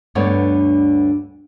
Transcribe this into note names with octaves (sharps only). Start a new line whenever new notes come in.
D2 G2 D3 B3 C#5 D5